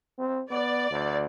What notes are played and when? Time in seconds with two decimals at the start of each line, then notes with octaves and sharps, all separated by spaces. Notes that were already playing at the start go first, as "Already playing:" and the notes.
0.18 C4
0.50 B3 D5
0.91 D2